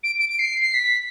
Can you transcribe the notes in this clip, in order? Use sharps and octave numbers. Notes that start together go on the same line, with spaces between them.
D7
D7
D7
C7
C7
B6